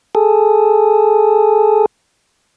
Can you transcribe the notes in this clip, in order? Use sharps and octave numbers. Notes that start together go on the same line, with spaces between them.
G#4 A4